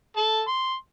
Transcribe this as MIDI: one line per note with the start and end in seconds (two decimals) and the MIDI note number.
0.17 0.41 69
0.17 0.41 81
0.48 0.74 84